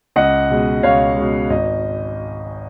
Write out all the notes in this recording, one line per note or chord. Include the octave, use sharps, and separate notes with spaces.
C#2 D#5 F#5
B2 G#3
C#2 C#5 F5
B2 G#3
G#1 D#5